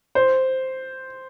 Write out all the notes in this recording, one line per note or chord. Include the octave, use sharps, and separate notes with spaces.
C5